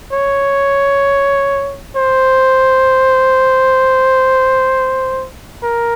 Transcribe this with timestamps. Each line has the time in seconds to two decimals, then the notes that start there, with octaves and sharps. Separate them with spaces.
0.13 C#5
1.96 C5
5.63 A#4